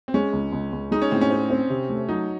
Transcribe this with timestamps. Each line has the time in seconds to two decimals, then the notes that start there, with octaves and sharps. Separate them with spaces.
0.08 C4
0.14 G#3 C#4
0.33 C#2
0.53 C#2
0.73 C#2
0.91 G#3 D#4
1.02 C#4
1.11 A2 C4
1.21 C#4
1.30 C4
1.50 C4
1.70 C3
1.89 A3
2.09 F#3 D#4